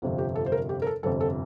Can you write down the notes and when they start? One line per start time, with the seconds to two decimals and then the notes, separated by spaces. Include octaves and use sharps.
0.02 G1 F2 C3 F3
0.18 G4
0.35 A4
0.46 C5
0.52 A#4
0.69 G4
0.82 A#4
0.87 A4
1.03 G1 F2 C3 A4
1.20 A4